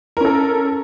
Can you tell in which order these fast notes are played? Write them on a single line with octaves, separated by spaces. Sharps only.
A#4 C#4 A4